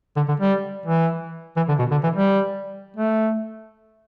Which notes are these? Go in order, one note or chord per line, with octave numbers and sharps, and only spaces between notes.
D3
D3
G3
E3
E3
D3
B2
D3
E3
G3
A3